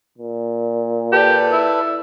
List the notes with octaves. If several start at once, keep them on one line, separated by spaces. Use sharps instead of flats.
A#2
G4 A4 B4 D5
E4